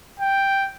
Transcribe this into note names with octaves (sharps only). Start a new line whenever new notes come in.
G5